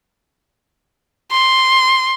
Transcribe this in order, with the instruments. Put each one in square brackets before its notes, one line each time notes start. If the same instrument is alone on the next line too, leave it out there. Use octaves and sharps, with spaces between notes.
[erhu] C6